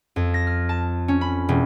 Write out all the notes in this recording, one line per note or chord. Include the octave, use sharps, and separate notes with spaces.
F2
A#6
F6
A5
C#4
B5
E1